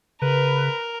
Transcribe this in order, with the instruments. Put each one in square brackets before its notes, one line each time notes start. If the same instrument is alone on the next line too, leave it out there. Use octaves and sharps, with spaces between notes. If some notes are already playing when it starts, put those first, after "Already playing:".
[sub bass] C#3 [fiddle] A#4 [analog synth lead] B4